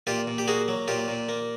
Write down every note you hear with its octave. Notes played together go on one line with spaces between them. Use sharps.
A#2 F4 G4
A#2
G4
A#3 F#4 G#4
F#3
A#2 F4 G4
A#2
A#3